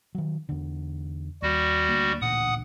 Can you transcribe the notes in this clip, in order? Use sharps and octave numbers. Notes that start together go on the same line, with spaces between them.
D#3 F#3
E2 D3
D#2 G3 F#4
D2 A#3
A1 D2 A#2 F#5 D#6